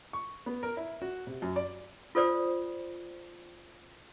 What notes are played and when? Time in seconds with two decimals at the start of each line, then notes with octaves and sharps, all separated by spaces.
0.13 C#6
0.46 B3
0.63 A#4
0.77 E4
1.02 F#4
1.27 C3
1.42 F#2
1.56 D5
2.15 F4 A4 C5 D5